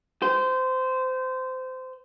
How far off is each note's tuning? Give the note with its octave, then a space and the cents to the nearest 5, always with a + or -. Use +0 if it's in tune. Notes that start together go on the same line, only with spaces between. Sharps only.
C5 -20